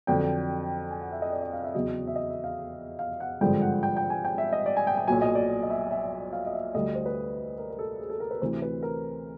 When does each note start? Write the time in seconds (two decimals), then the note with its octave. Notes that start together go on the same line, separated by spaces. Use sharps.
0.07 F2 D3 F#3 G5
0.91 G#5
1.01 F#5
1.12 E5
1.22 D#5
1.32 D5
1.43 D#5
1.53 F5
1.64 E5
1.74 E2 C#3 F#3 D#5
2.07 E5
2.16 D#5
2.30 E5
2.44 F5
2.99 F5
3.20 F#5
3.41 G#1 G2 D3 F3 G#3 G5
3.62 F#5
3.83 G5
3.97 G5
4.10 G#5
4.25 G5
4.38 E5
4.53 D#5
4.66 D5
4.77 G#5
4.87 G5
4.97 G5
5.08 B1 A#2 F#3 G#5
5.22 D#5
5.35 D5
5.63 D#5
5.70 E5
5.91 E5
6.33 F5
6.46 D#5
6.54 E5
6.74 D2 D3 G3 D#5
6.95 C5
7.06 B4
7.58 A#4
7.70 A#4
7.79 A4
8.00 G#4
8.09 A4
8.20 A#4
8.31 B4
8.42 D2 C3 E3 C5
8.62 B4
8.83 A#4